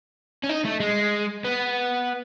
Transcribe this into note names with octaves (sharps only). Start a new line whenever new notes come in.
C#4
D#4
A3
G#3
B3